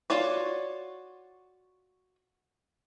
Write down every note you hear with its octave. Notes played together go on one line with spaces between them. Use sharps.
F4 F#4 C#5 D5